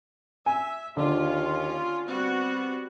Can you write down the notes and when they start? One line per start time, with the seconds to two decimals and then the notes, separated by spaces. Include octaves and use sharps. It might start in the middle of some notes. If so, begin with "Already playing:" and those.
0.46 E5 G#5
0.97 D#2 D3 C#4 F4
2.08 G3 B3 C4 F#4